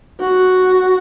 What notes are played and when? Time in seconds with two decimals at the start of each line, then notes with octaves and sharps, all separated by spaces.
0.20 F#4